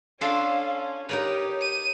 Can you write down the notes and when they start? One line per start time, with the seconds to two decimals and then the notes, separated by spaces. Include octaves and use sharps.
0.21 C#4 D4 F4 A4 F5
1.09 D#4 G4 A#4 B4 C#5
1.61 D#7